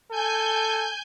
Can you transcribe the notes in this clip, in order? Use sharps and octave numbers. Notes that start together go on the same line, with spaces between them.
A4 G#5 G6